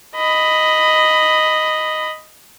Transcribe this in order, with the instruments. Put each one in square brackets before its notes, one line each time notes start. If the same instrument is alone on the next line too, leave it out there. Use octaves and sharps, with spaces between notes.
[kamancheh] D#5 B5